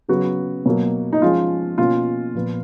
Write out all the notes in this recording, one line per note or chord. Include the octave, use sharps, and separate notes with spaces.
C#3 F#3 B3 F#4
B2 F#3 A#3
D#4
F3 G#3 C#4 F4
B2 A#3 C#4 F4
A#2 F3 B3